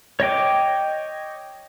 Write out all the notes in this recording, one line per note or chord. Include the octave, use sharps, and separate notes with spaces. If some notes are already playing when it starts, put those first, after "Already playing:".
C#5 D#5 G5 D6